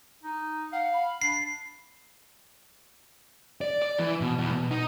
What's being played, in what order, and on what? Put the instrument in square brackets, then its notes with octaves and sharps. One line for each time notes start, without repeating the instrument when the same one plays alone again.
[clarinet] D#4
[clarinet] F5 [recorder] F#5
[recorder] B5
[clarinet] D4 [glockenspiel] C7
[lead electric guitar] D5
D5
E3
B2
E2
B2
D#4